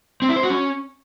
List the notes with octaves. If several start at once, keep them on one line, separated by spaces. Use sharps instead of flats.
C4
E4
C5
F#4
C#4